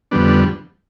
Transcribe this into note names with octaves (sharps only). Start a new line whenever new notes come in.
F2 D3 G3 B3 D4
D4